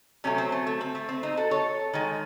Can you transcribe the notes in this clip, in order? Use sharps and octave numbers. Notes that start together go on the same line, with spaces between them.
C3 F#3 A3 C#4
C4
A3
A3
C4
A3
C4
C4 D#4
F#4 A4
A4 C#5
D#3 G#3